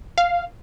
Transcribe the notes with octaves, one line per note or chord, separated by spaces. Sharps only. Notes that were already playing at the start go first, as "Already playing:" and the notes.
F5